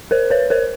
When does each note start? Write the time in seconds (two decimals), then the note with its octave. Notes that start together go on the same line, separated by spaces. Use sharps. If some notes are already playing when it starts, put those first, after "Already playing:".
0.11 A#4 C5
0.30 B4 C#5
0.50 A#4 C5